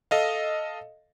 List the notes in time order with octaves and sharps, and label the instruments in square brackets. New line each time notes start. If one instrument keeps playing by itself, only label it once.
[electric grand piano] A4 D#5 F5